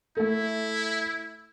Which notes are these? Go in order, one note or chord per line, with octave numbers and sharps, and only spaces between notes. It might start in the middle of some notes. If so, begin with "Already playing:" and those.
A3 E4 A4